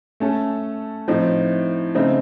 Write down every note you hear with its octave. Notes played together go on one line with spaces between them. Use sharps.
A3 C#4 A4
A2 F3 C4 D#4
C#3 A3 C4 D#4